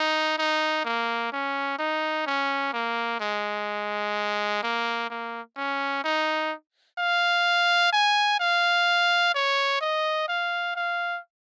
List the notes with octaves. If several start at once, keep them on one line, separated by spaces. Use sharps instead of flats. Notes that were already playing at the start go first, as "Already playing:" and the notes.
Already playing: D#4
D#4
A#3
C#4
D#4
C#4
A#3
G#3
A#3
A#3
C#4
D#4
F5
G#5
F5
C#5
D#5
F5
F5